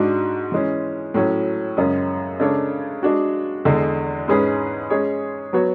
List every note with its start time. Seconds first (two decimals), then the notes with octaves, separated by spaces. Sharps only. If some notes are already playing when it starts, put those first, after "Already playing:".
Already playing: G#2 G#3 D4 F#4
0.52 E3 G#3 C#4
1.14 A2 F#3 C#4 F#4 C#5
1.77 F#2 C#3 G#3 C#4
2.40 C#3 G#3 D4 A4 C#5
3.03 G#3 D4 F#4
3.65 E2 D3 G#3
4.28 G#2 G#3 C#4 G#4 B4
4.90 G#3 C#4 G#4 C#5
5.53 F#3 B3 F#4 C#5